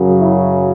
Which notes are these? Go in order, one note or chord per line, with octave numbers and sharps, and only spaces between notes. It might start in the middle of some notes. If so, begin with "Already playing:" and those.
Already playing: F#2 C#3 F#3
E4